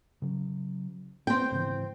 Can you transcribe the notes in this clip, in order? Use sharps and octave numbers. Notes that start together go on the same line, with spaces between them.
C#3 F#3
B3 C4 G5
G#2 C#3 E3